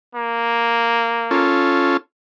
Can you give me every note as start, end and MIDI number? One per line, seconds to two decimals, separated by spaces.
0.15 1.50 58
1.31 1.97 61
1.31 1.97 65
1.31 1.97 69